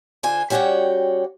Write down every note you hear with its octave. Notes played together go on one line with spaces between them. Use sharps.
D3 F4 C5 G#5
G3 C#4 F#4 C#5 D5 G5